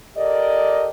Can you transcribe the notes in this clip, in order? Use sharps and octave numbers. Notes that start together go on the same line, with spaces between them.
G4 A4 A#4 D5 D#5